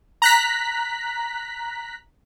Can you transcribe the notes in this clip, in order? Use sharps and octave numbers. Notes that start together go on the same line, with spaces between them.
A#5 F#6 B6